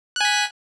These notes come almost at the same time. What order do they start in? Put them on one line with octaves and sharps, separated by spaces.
F#6 G#5 B6